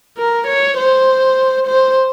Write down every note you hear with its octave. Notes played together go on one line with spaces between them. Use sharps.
A#4
C#5
C5
C5